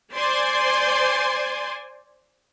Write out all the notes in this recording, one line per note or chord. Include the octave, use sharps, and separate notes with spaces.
C5 D5 G#5 C6